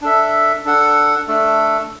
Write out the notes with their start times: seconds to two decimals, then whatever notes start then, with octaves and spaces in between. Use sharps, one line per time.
0.02 D4 A4 E5
0.65 D4 A4 F#5
1.28 A3 D4 A4